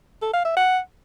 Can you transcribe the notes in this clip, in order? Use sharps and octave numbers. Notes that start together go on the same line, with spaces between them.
A4
F5
E5
F#5